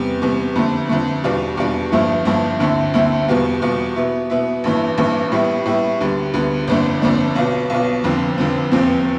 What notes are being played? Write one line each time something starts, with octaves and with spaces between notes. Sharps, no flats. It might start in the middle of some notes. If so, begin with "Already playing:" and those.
Already playing: E2 C3 G3 B3
E2 C3 G3 B3
F2 D3 A3
F2 D3 A3
E2 B2 G3 D4 F4
E2 B2 G3 D4 F4
G1 G2 F3 A3 E4
G1 G2 F3 A3 E4
D2 D3 A3 C4 E4
D2 D3 A3 C4 E4
E2 B2 G3 B3 F4
E2 B2 G3 B3 F4
B2 B3 E4
B2 B3 E4
A1 G2 E3 A3 E4
A1 G2 E3 A3 E4
A2 G3 B3 E4
A2 G3 B3 E4
D2 D3 G3 B3
D2 D3 G3 B3
G1 F2 D3 A3 D4
G1 F2 D3 A3 D4
B1 B2 B3 F4
B1 B2 B3 F4
F1 F2 D3 F3 C4
F1 F2 D3 F3 C4
F1 E2 C3 F3 C4